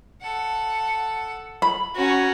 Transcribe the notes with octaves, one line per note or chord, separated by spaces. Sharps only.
A4 F#5
B5
C#4 F#4 A#4